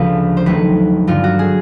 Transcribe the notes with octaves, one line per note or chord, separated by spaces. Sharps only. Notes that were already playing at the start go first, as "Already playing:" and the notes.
Already playing: D2 C#3 F3 G#3 B4
C5
D#2 D#3 F#3 A3 B4
G2 D3 F#3 F4
F#4
G#4